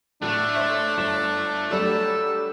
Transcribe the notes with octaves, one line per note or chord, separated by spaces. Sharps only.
A2 D3 A3 D4
C5 C#5 E5
G1 E7
D3 F#3 G3 A4